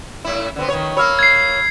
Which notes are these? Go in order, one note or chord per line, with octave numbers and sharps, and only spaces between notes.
A2 E4
D3 B3 C4
D#3 B3 C#5
A#3 C#5 B5 E6 F6
G#6 C7